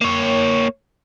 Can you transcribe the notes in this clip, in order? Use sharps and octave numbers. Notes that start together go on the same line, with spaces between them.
A#3 C#5